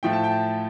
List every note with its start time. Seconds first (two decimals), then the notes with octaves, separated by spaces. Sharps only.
0.03 A2 F3 A3 G5
0.13 A5
0.24 G5